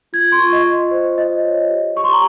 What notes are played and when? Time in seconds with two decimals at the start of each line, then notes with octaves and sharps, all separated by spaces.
0.13 F4 G#6
0.32 C6
0.39 F4 C#6
0.53 D#5
0.66 F4
0.91 C5
1.18 F4 D#5
1.44 C#5
1.70 G4
1.96 G4 C#6
2.04 C6
2.13 A#5